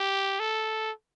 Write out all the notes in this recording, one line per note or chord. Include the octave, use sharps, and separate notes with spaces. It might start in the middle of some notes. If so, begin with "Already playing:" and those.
Already playing: G4
A4